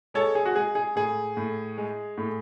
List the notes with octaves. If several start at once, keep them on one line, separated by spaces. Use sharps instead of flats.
G#3 A4 C#5
G#4
F#4
G#3 G#4
G#4
A2 G#4
A2
G#3
A2